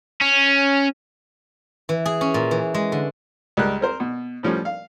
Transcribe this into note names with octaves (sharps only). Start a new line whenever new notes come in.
C#4
E3
G#4
C#4
A#2
E3
G#3
D3
C#2 G3 A#4 F#6
C4 A#4 C5
B2
A2 F3 G3 C#4
F5